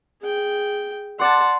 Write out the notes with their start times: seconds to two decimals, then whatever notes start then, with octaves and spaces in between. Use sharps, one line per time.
0.21 G#4 G5
1.19 D5 F#5 A5 C6